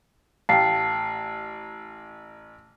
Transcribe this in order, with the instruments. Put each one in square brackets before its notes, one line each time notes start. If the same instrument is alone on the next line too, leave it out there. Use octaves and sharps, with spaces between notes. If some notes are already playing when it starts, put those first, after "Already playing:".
[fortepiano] A1 [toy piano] F5 G5 [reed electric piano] A5 [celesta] C7